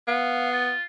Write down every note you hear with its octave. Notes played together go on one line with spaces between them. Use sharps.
B3 F5
F4